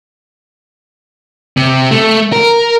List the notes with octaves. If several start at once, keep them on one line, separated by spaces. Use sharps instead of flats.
C3
A3
A#4